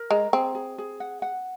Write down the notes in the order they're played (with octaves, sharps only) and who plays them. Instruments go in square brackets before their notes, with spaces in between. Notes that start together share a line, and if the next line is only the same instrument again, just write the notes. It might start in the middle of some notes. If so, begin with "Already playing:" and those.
Already playing: [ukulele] A#4
[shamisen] G#3 [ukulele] A#5
[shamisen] C4 [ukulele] G#4
[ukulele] G#4
G#4
F#5
F#5